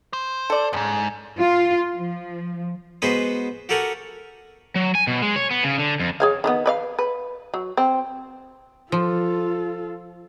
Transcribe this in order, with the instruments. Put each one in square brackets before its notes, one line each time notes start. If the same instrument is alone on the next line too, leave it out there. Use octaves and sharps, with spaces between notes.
[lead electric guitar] C5
[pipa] A4 D5
[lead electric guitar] F2 G#2 [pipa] C#3
[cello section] F4
F3
[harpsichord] G#3 B3 F#4 G#4 B4 C5
F#4 G4 A4 A#4 F#5 G#5
[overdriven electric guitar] F#3
G#5
B2
G#3
C#5
B3
C#3
D3
F2
[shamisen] G#4 C#5 F5
D#3 A3 B3
B4 D5 F5
B4
F#3
C4
[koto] F3 [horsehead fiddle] F4 A4